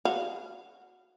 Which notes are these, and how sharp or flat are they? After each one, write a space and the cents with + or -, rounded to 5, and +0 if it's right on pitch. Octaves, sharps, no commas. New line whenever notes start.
F#4 -20 F5 -15